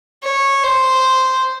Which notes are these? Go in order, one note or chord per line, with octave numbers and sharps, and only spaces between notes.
C#5
C5